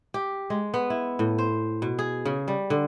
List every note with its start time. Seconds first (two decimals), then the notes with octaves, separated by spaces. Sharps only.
0.14 G4
0.50 G#3
0.74 B3
0.90 E4
1.19 A2
1.38 C5
1.82 B2
1.99 G#4
2.25 C#3
2.48 G3
2.70 D3